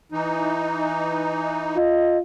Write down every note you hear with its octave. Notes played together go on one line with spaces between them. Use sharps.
E3 D#4
F4 D#5